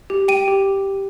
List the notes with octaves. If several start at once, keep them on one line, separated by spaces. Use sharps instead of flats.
G4
G5 D#7
G4